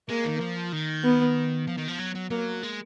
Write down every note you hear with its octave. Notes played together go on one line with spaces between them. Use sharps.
G#3 A#3
D#3
F3
D#3
B3
F3
D#3
F3
F#3
F#3
F#3 A#3
G#3